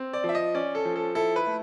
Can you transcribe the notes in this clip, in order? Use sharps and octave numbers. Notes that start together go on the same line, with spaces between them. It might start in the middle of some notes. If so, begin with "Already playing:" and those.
Already playing: C4
D5
F3
E5
D#5
C#4 D5
A4
F3
A4
E4 A4
B4
A3